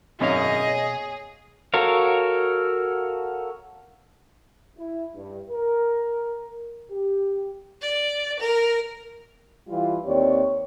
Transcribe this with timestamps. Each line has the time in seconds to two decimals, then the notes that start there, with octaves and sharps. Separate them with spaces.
0.20 G#1 F#2 B2 G#4 C#5 D#5 F5
0.67 C#5
1.74 F#4 A4 A#4 C#5 F5
4.78 E4
5.15 G2
5.50 A#4
6.90 G4
7.82 D5
8.40 A#4
9.69 E3 G3 F4
10.05 D#2 C4 G4 C#5 D5